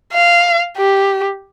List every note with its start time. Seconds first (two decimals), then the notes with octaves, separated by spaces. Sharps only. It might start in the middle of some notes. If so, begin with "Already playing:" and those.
0.13 F5
0.77 G4